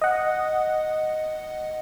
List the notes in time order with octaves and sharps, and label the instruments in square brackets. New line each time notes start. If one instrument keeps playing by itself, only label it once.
[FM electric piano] D#5 F#5